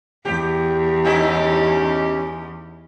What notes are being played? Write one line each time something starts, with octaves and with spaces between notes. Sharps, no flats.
E2 G4
G2 C#4 D#4 E4 G4